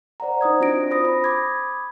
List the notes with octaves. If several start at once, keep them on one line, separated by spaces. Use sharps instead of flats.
C5 D5 F#5 A#5
D#4 C5 D#6 G#6
C4 D4 F4 F#4 A#6 D7
C5 B5 D#6 A#6
B5
B5 D6 D#6 G#6